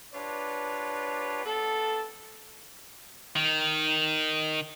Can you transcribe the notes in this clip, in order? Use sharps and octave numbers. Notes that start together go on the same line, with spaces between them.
D4 F4 G4 B4 C#5
B3 D4 A4
D#3